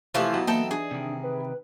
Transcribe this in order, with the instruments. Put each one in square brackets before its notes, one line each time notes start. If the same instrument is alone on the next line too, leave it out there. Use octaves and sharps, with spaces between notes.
[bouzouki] C3 E3 F3 [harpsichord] A3 F4 [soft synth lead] E4
[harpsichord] B2 [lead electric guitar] F#3 B3
[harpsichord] E3 D#4 [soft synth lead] A#3 [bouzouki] A4 G5
[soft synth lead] D4 [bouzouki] G#4
[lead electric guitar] C3 D#3
[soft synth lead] B4